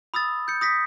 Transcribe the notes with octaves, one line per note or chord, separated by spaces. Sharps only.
B5 D#6 E6 A6
G6 C#7
D#6 A#6 B6